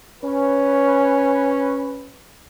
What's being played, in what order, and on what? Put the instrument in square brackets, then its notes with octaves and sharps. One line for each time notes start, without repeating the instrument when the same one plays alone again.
[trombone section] C#4 B4